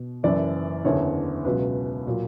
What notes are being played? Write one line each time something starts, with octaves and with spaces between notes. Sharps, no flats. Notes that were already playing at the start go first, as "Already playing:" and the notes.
Already playing: B2
F#1 F#2 E3 D5
F#1 E2 D3 C#5
C#2 B2 F#3 B4
A#2 F#3